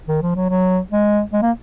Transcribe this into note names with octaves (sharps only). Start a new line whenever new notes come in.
D#3
F3
F#3
F#3
G#3
G#3
A#3